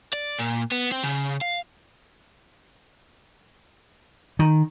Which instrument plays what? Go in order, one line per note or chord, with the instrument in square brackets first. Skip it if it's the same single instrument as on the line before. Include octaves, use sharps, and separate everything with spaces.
[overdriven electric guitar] D5
A#2
B3
C4
C#3
F5
[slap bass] D#3